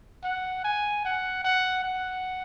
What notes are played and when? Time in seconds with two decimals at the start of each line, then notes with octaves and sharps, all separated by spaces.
0.24 F#5
0.64 G#5
1.05 F#5
1.44 F#5
1.84 F#5